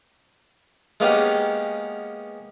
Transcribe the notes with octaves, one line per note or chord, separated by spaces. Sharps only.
G#3 A#3 B3 C#4 D#4 G4